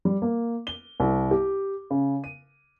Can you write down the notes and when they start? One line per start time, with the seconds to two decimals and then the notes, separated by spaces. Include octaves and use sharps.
0.05 G3
0.22 A#3
0.67 G7
1.00 C2
1.31 G4
1.90 C#3
2.24 D#7